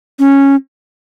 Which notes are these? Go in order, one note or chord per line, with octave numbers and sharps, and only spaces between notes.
C#4